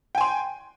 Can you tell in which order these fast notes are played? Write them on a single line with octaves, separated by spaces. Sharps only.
G5 G#5 C6